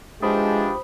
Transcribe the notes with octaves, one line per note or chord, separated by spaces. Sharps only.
E3 F3 G#3 D4 G4 C5 B5 D#6